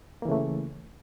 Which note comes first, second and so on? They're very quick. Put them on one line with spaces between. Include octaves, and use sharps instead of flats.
A#3 E3 C#3 A3